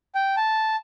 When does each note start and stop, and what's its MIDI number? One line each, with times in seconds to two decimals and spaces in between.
0.15 0.35 79
0.37 0.76 81